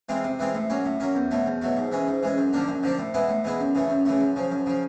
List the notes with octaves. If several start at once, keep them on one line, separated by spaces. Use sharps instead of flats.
E3 G#3 C4 F4
C3
E3 G#3 C4 F4
A2
F#3 A#3 C#4
A2
F#3 A#3 C#4
E2
B2 F#3 A3
E2
B2 F#3 A3
G#2
E3 G#3 C#4
G#2
E3 G#3 C#4
F#2
D3 F3 A#3 D4
F#2
D3 F3 A#3 D4
A2
E3 G#3 B3 E4
A2
E3 G#3 B3 E4
F#2
C#3 E3 A3
F#2
C#3 E3 A3
F#2
C#3 F3
F#2
C#3 F3